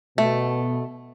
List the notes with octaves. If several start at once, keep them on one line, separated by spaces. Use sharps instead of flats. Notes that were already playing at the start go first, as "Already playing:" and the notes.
B2 A3